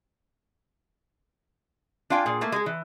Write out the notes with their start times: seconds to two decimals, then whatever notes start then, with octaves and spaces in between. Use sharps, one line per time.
2.10 D4 F4 F5 G5 G#5
2.26 A#2 G#4
2.41 A3 A#3 E4
2.52 G#3 G#4
2.66 E3